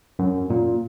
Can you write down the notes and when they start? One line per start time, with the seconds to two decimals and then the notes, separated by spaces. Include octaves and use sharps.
0.19 F#2
0.50 A#2